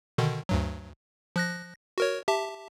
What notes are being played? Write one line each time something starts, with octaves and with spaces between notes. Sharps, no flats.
B2 D3 D#3
D2 G2 F#3
F3 F#6 A#6
F#4 A#4 C#5
G4 E5 A5